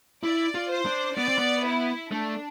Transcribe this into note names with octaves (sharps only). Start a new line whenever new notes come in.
E4 D5
F4
C5
D4
B3 D5
C4
B3
E4
A3 D4